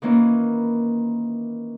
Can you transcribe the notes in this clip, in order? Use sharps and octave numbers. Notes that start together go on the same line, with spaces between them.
D#3 E3 A#3 C#4 E4